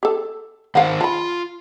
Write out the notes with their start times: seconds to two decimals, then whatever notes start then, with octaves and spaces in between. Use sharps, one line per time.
0.03 G4 A4
0.75 D#3 C5 F5 F#5
1.01 F4 A5 B5